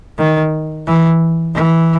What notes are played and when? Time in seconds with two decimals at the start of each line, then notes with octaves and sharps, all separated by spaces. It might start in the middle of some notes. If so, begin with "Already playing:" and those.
0.18 D#3
0.87 E3
1.55 E3